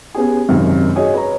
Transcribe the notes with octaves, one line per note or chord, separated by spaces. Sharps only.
B3 C#4 G4 G#4
G#1 F#2 C3 D#3
F#4 G#4 C#5 D#5
B4 C#5 A#5